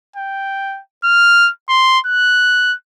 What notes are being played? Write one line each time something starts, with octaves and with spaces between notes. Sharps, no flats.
G5
F6
C6
F#6